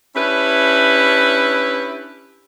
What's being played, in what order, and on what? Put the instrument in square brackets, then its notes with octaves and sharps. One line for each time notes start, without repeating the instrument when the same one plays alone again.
[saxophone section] C#4 D4 E4 G4 B4